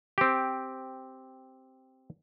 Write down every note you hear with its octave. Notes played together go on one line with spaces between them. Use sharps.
C4 G4